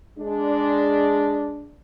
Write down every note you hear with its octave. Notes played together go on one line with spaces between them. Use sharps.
G#3 D4